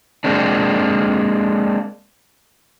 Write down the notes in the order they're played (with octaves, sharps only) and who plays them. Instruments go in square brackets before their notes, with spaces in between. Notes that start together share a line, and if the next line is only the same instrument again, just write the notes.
[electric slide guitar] G#3 A#3 C4 D4